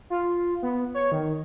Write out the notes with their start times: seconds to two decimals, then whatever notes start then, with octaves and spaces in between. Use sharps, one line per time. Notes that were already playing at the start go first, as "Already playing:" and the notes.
0.10 F4
0.63 B3
0.94 C#5
1.12 D#3